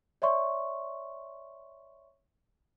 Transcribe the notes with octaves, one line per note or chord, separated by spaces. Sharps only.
C#5 D5 E5 C6 C#6